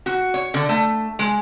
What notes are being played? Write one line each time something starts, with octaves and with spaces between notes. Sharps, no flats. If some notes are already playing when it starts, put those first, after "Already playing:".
F#4
C#5
D3
A3
G#3